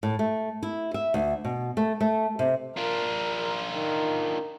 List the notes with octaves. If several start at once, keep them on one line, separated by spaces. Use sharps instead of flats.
A2
A3
E4
E5
D2
B2
A3
A3
C3
D4 F4 A#4
D#3